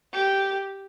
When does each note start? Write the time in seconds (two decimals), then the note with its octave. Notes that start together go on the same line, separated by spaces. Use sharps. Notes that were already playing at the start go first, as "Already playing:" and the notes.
0.13 G4